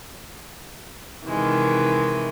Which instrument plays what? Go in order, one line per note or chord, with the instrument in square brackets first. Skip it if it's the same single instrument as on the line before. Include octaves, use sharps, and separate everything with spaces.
[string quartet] C3 D#3 E3 G#3